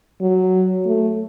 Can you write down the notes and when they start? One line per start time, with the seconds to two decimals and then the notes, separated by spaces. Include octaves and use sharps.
0.21 F#3
0.86 A3